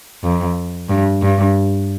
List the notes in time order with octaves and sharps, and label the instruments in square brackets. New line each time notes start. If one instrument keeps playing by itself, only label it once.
[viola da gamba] F2
G2
G2